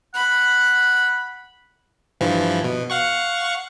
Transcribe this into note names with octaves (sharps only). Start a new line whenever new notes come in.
F#5 B5
G2 E3 F3
B2
F5 F#5 C#6